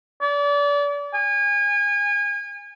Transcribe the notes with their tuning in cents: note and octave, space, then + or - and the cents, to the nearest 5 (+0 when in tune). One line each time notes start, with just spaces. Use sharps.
D5 -35
G#5 -30